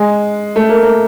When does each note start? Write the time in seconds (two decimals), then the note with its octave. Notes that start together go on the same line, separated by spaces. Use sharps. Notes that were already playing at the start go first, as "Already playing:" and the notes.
Already playing: G#3
0.56 A3
0.69 A#3
0.82 A#3